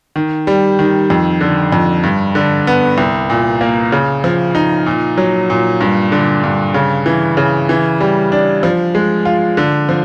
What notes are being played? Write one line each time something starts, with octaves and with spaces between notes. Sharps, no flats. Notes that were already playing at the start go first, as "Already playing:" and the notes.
D#3
G3
D#3
F2
D3
F2
G2
D3
B3
C2
A#2
A#3
C#3
F3
D#4
A#2
F#3
A#2
G2
D3
G2
C#3
E3
C#3
E3
G3
D4
F3
G#3
F4
D3
F3